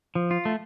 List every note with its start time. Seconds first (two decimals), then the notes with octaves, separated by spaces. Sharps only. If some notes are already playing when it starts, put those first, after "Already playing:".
0.15 F3
0.31 F4
0.45 A3